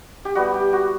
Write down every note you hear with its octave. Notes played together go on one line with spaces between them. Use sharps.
G4
G3 B3 E4 F#4
G4
F#4